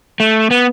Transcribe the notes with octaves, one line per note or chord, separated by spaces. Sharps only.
A3
B3